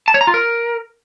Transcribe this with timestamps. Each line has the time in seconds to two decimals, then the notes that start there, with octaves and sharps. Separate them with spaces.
0.08 A5
0.14 C#5
0.21 A#5
0.27 F4
0.34 A#4